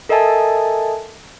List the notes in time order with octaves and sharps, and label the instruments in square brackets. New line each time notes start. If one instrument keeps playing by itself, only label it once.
[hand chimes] A4 A#4 D#5 E5 G#5 A5